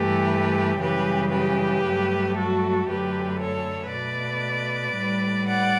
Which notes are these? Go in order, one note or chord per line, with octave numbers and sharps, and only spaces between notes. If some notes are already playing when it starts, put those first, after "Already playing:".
Already playing: G2 E3 A3 G4 B4
F#2 C#3 E3 G3 G4 B4
G4 B4
G2 F#3 A3
F#4 A4
F#2 D3 F#3 A3 G4 B4
A4 C#5
B2 A3 B4 D5
A2 G3
D5 F#5